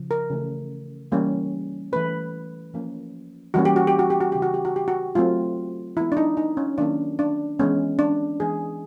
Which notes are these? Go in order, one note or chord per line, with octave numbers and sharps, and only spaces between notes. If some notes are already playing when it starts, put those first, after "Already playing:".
Already playing: C#3 F3
A#4
C#3 E3 A3 C#4
E3 G3 A#3 C#4
E3 A3 C#4 B4
F3 A#3 C#4
E3 G3 A#3 C#4 F#4
G4
F#4
G4
F#4
G4
F#4
C#3 E3 G3 G4
F#4
G4
F#4
G4
F#4
F#3 A3 C4 F4
E3 G#3 B3 E4
D4
D#4
D#4
C#4
D#3 F#3 A#3 C#4 D4
D4
E3 G#3 B3 C#4
D4
E3 G#3 B3 G#4